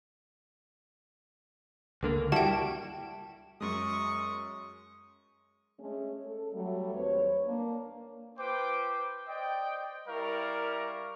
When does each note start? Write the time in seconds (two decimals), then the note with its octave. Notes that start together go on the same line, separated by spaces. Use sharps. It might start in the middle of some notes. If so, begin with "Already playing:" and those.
2.03 C#2 D3 A#3
2.32 G3 E4 F#4 G5 A5
3.61 F#2 G#3 C#6 D#6
5.79 G#3 A3 C#4
6.24 A4
6.53 F#3 G3 A3
6.94 D#2 C4 B4 C#5
7.45 A#3 D4
8.39 F4 B4 C5 G5 D6
9.28 C5 D5 D#5 G5
10.08 G3 E4 A#4 D5 F5 C#6